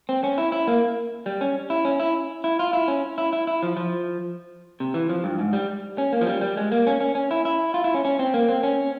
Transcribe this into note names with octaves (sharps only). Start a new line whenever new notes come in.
C4
C#4
E4
E4
A#3
G3
C#4
E4
C#4
E4
E4
F4
E4
C#4
E4
E4
E4
F3
F3
C3
E3
F3
G2
G#2
G3
C#4
A#3
F3
G3
G3
G#3
A#3
C#4
C#4
C#4
E4
E4
F4
E4
C#4
C#4
C4
A#3
C4
C#4